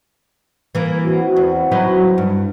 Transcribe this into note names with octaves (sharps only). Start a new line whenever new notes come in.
E3 A#3
C4 E4 F#4
E2
F#3 D#4 B4
G2